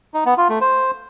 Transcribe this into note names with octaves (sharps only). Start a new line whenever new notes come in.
D#4
B3
F4
A3
C5